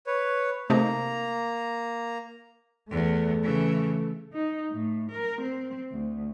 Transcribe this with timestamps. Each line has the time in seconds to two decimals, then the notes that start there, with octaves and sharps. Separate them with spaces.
0.07 B4 C#5
0.70 C3 A3 A#3 D#4 A#5
2.91 E2 A3
3.43 C#3 E3
4.33 D#4
4.72 A2
5.12 A#4
5.42 C4
5.92 D2